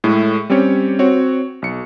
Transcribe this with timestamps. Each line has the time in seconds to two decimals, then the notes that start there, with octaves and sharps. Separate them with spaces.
0.04 A2 G#3 A3
0.50 G3 C4 C#4 G4 C#5
0.99 C4 F#4 C#5
1.62 B1 C#7